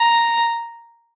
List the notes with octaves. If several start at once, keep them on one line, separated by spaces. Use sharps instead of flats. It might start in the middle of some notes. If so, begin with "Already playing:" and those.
Already playing: A#5